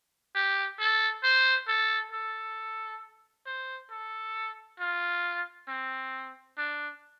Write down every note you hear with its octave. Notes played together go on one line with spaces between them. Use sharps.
G4
A4
C5
A4
A4
C5
A4
F4
C4
D4